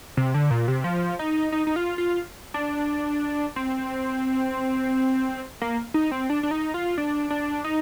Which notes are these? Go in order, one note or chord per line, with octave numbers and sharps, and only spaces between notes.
C3
D3
A#2
C3
F3
D#4
D#4
D#4
F4
F4
D4
C4
A#3
D#4
C4
D4
D4
D#4
F4
D4
D4
D#4